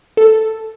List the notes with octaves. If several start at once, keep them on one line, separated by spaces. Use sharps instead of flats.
A4